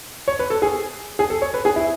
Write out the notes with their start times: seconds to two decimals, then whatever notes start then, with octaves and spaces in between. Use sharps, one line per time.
0.28 C#5
0.39 B4
0.50 A4
0.62 G#4
1.19 G#4
1.30 A4
1.42 C#5
1.54 B4
1.65 G#4
1.76 E4